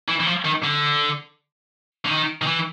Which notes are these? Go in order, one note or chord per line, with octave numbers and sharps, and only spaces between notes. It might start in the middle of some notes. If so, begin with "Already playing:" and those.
E3
E3
F3
D#3
D3
D3
D#3
D#3
E3